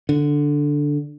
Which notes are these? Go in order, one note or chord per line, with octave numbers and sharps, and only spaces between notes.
D3